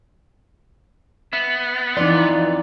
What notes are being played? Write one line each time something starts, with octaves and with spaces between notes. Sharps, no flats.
B3 E5
F2 E3 D#4 F4 D5 C6